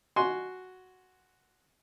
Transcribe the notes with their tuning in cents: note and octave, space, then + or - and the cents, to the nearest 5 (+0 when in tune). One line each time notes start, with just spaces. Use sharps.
F#4 +0 G#5 +10 C6 +0